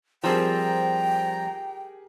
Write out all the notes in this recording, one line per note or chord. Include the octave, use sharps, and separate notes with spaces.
F3 G3 C4 G4 G#4 A#4 G5 A#5